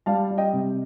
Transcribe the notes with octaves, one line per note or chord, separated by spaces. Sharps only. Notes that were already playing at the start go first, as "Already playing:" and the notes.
G3 F5 A5
G3
D#5 G5
C3